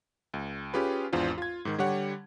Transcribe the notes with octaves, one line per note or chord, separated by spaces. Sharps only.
C#2
C#4 F4 G4 G#4 B4
G#1 E2 D4 F4 C5
F4 G#6
G#2 D#3
D3 G3 G4 C#5 F#5